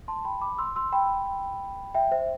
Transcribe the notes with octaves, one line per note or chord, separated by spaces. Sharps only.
A5 C6
G5 B5
B5 D6
C6 E6
C6 E6
G5 B5
E5 G5
C5 E5